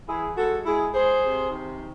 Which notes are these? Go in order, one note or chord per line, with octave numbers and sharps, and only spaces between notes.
E3 E4 G#4
G#3 F#4 A4
G#3 E4 G#4
G#3 G#4 C5
C3
D#3